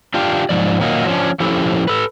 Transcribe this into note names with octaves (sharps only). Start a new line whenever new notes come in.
D4 F4 G4
G#2 F3 D5
A#2 D#3 F#3 A#3 D#4
F3 C#4 D4
F3 C#4 E4 G4 A4
A4 B4